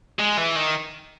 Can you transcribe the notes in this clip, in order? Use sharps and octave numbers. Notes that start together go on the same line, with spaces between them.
G#3
E3
D#3